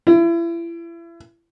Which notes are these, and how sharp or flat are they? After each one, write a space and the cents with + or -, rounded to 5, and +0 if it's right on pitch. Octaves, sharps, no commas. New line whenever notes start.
E4 +35